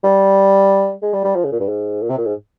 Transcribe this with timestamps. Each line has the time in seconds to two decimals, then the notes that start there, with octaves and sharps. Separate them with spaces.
0.04 G3
1.03 G#3
1.14 G3
1.24 G3
1.36 F3
1.44 C#3
1.52 A#2
1.60 G2
1.69 G#2
2.02 A#2
2.10 C3
2.18 A#2
2.26 G#2